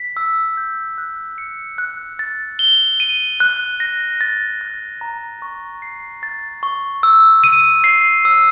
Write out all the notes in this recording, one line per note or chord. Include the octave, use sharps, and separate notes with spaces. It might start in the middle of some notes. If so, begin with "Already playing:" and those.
Already playing: B6
E6
G6
F#6
C#7
F#6
A6
G7
D#7
F#6
A#6
A6
F#6
A#5
C#6
C7
A6
C#6
E6
D#7
C7
E6